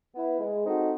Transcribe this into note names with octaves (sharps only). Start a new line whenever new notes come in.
B3 E4
G#3
C4 D#4 F#4 A4